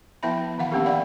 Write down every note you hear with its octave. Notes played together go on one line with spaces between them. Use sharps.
F3 B3 E4 E5 G5 B5
D#3 E3 F5 F#5
A#3 B3 C#4 D4 G4 A#4
D5 F5 G5 B5